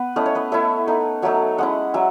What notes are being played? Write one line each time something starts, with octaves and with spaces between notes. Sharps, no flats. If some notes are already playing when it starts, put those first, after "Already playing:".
Already playing: B3 B4
A3 C#4 E4 D#5
C#5
B4 D#5
A3 E4 C#5 E5
A3 D#4
F#3 A3 D#4 C#5 E5
G#3 C#4 E4 D#5 F#5
F#3 E5 G#5